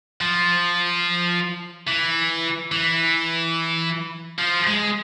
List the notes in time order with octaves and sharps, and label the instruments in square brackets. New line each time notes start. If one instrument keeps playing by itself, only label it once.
[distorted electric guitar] F3
E3
E3
F3
G#3